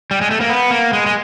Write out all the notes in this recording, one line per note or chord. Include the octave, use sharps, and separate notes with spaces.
G3
G#3
A3
A#3
B3
A#3
G#3
G#3